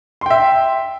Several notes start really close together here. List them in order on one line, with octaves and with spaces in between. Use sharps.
C6 G5 E5